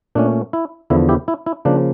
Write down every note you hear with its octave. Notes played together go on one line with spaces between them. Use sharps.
A#2 A3 C#4 D4
E4
E2 D3 F3 E4
E4 G4
E4
E4
C#3 F3 A#3 D4